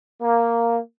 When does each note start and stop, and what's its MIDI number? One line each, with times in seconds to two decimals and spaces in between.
0.22 0.79 58